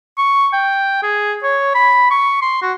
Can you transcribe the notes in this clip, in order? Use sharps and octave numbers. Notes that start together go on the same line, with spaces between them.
C#6
G5
G#4
C#5
B5
C#6
C6
F#4